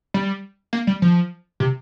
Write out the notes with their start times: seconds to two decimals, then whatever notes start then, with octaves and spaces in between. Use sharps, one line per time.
0.14 G3
0.73 A#3
0.87 G3
1.02 F3
1.60 C3